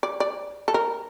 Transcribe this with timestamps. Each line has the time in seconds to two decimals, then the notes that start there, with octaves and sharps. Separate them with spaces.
0.03 D5
0.20 D5
0.68 A4
0.74 A#4